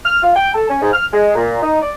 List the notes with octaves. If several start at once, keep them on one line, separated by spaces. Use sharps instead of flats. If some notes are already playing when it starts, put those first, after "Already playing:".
F6
F4
G5
A4
C#4
G#2
F6
G#3
A#2
D#4
D5